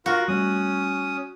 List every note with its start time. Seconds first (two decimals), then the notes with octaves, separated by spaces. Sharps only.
0.06 F4 F#4 A#4
0.28 G3 A3 C#4 D#6